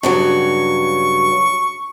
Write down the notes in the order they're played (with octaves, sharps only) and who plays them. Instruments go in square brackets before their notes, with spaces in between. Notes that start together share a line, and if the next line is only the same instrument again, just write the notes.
[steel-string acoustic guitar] G2 C#3 F#3 [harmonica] C#6